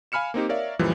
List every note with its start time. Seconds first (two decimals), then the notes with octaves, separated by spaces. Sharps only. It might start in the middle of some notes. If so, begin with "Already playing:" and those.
0.12 F5 G#5 B5 F6 C#7 E7
0.34 A#3 C4 D#4 G4
0.49 A#4 C#5 D5 E5 F5
0.79 C#2 F#2 A#2 E3 F3 G3